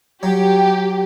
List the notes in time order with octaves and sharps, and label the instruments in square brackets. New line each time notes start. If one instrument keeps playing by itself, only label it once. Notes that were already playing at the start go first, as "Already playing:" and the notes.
[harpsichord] F#3 [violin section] G4